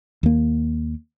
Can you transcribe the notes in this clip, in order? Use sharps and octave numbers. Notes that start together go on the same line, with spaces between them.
D#2 A#3